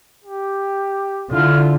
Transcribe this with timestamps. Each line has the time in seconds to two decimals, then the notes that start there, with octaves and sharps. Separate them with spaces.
0.24 G4
1.32 D3 E4 F4 F6